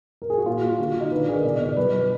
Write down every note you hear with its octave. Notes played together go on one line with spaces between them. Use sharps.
A#4
G#4
F#4
A#2 F4
A#2
D3 F#4
D3
D#4
D3 B4
D5
D3 G#4
A#4
B2 D5
D#5
B2
D5
F#3 B4
F#3